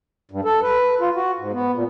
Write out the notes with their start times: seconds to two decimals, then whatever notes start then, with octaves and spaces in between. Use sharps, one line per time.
0.31 G2
0.45 A4
0.62 B4
1.00 F4
1.16 F#4
1.39 G#2
1.52 B3
1.74 A#2